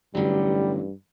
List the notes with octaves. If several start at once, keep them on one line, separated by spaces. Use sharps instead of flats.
A1 G2 D3 F#3 G3